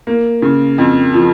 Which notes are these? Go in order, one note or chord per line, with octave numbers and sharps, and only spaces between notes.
A#3
C#3
F2
F3